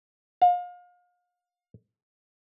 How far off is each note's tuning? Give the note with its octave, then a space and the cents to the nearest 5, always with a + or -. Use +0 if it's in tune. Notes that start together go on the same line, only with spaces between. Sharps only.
F5 +35